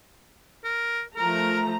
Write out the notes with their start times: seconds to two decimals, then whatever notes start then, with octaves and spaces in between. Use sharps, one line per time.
0.64 A#4
1.16 F3 A3 A#4 A#5